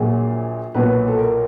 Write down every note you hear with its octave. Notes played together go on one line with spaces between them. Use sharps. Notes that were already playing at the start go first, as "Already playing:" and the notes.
Already playing: A#1 A#2 F#3 G#4
B1 A#2 F#3 B4
A4
A#4